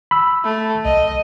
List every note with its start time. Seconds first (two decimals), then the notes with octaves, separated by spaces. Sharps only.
0.11 B5 E6
0.44 A3
0.85 B1 D#5